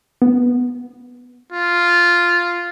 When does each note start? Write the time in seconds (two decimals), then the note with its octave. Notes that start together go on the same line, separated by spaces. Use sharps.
0.22 B3
1.52 F4